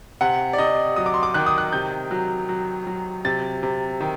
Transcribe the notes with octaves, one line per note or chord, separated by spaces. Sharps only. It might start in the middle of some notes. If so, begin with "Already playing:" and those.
C3 F#5
D5
C3 D#5
F#3 D#6
D6
C6
D6
D#3 F#6
D#6
F#6
C3 G6
F#3
F#3
F#3
C3 A6
C3
D#3